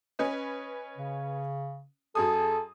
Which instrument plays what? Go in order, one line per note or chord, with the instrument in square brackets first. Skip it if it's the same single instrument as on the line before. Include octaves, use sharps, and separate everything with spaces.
[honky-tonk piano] C#4 B4 D#5
[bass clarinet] C#3
[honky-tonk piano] F#2 G#4 D#6 [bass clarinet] A4